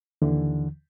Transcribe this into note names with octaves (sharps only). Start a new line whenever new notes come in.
D#2 D3 E3